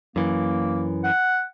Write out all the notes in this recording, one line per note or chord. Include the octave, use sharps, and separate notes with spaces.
F#2 E3 A#3
F#5